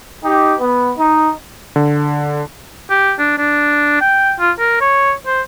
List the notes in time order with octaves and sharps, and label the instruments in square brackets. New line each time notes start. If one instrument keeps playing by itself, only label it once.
[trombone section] D#4 G4
B3
D#4
[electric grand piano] D3
[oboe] G4
D4
D4
G5
F4
A#4
C#5
C5